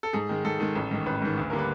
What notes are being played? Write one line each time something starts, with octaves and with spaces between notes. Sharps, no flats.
A4
G#2 G#4
D#3 G#3
G#2 A4
D#3 G#3
A1
G#2 D#3
A1 B4
G#2 D#3
D2
D3 G3 A#3 A#4
B4